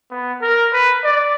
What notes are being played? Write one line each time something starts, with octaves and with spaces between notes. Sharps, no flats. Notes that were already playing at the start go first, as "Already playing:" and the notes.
B3
A#4
B4
D5